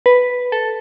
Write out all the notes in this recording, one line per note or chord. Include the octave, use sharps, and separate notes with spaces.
B4
A4